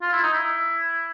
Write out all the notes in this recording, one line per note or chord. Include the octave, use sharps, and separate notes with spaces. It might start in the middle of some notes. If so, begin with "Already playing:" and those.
F4
E4
D#4
E4